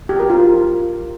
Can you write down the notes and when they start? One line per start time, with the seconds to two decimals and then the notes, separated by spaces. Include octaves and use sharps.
0.09 G4
0.19 A#4
0.30 F4